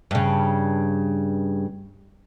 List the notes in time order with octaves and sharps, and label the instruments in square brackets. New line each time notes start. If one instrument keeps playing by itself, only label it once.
[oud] G2 C#3